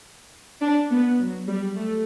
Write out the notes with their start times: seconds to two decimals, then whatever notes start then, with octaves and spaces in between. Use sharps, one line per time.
0.61 D4
0.91 B3
1.19 F#3
1.48 G3
1.76 A3